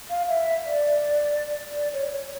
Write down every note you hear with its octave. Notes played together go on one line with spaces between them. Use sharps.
F5
E5
D5
D5
C#5
C#5